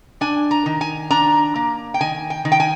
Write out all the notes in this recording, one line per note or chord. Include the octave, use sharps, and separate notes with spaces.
D4 G#5
A#5
D#3
G#5
D4 A#5
A#3
G5
D#3 G#5
G5
D#3
G5
G#5